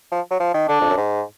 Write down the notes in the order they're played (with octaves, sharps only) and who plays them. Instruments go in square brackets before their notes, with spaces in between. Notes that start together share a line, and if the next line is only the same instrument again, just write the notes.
[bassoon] F3
F#3
F3
D#3
[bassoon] D3 [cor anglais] D4
[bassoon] F2
F#2
G#2